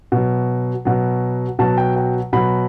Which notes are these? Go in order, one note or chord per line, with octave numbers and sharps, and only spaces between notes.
B2 F#3
B2 F#3
B2 F#3 A5
G5
G5
B2 F#3 B5